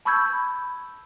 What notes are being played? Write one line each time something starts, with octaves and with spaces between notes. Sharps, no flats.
A5 B5 C#6 E6 G6 G#6